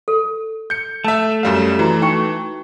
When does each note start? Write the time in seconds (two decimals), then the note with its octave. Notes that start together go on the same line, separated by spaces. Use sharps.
0.08 A4
0.70 G6 C#7
1.04 A3 E5 A5
1.43 F#2 G3 F5
1.79 E3 F#4 A#5
2.02 D#4 G5 C#6